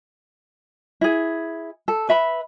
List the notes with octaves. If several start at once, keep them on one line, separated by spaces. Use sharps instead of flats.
E4 G#4
A4
B4 E5 B5